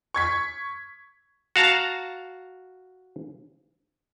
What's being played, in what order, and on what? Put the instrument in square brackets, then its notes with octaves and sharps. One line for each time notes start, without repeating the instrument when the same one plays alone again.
[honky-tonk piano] C#6 G#6 B6
[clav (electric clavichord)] F#4 F5 A5 A#5